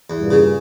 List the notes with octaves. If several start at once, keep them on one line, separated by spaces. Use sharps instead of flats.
E2
G2 A#2
C#3